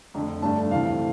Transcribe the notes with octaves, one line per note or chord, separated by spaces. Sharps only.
F2 D3 A3
G2 D3 A3 D4 A5
D2 C3 E3 A3 C4 F5